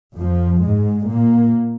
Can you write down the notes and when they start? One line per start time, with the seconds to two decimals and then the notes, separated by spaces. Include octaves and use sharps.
0.18 F2 F3
0.62 G#2 G#3
1.08 A#2 A#3